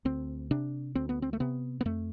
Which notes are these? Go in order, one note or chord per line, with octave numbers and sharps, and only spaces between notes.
D2 C4
C3 D4
D2 C4
B3
C4
A3
C3 B3
B3
F2 A3